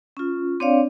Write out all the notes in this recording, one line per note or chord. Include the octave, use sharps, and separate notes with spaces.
C#4 F4
C4 D4 C#5 D5 F5